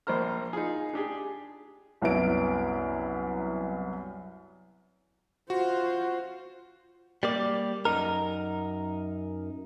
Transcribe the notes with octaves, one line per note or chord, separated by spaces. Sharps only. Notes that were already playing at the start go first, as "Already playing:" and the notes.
A#1 A#3 C5 A#5 F6
D#4 F4 G#4
D4 G4 G#4
C2 F#2 B3 E4 D7
F4 F#4 C5
G3 A#3 D5
F#2 D#4 A#4